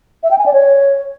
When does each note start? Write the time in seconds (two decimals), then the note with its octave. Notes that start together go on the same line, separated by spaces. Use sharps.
0.23 E5
0.31 G5
0.38 G#5
0.46 D5
0.53 C#5